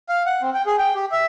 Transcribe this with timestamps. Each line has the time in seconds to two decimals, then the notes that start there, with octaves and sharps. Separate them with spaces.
0.09 F5
0.26 F#5
0.42 C4
0.54 G5
0.66 G#4
0.79 G5
0.95 G4
1.12 E5